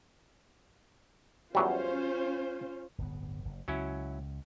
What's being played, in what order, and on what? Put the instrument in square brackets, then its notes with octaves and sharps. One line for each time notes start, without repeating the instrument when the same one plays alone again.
[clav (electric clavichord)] E2 F#3 G3 [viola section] C#4 F4 C5
[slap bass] D1 G1 B3
F#1
[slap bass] C#2 [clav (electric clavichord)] F#3 C#4 E4